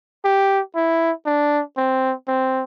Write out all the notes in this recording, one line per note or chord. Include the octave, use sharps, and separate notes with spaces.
G4
E4
D4
C4
C4